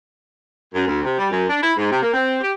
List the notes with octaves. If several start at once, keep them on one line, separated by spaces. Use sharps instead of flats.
F#2
D2
C3
G3
F#2
D4
E4
G#2
C3
A#3
C4
G4